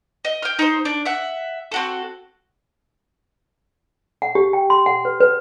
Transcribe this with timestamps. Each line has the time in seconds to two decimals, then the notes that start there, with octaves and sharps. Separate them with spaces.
0.25 D#5
0.42 G5 F6
0.59 D#4 C5
0.85 D4
1.05 E5 F#5
1.72 C4 F#4 A4
4.22 F#5
4.35 G4
4.53 G5
4.70 C6
4.86 F#5
5.05 B4
5.21 B4